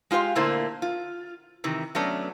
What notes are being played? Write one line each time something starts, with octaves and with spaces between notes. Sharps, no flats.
G#3 F4 G4 C5 F5
A#2 D3 A3 A#3 E4 C5
F4
C3 D#3 E3
F#3 A3 B3 C#4 D4